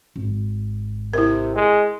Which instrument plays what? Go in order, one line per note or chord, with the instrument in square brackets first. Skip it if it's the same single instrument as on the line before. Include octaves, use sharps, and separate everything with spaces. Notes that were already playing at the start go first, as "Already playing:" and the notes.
[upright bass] G#1
[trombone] C3 [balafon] E4 A#4
[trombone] G#3